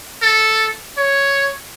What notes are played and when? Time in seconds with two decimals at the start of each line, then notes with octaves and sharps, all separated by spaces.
0.22 A4
0.98 C#5